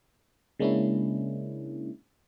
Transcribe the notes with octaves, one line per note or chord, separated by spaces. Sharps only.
C#3 G#3 A#3 C#4 D4 E4